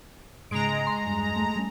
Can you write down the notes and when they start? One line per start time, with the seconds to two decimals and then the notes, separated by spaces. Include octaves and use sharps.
0.51 G#2 C#3 G#3 A#5 D7
0.87 C6
1.06 E1 G2
1.36 A3
1.56 G3 C#4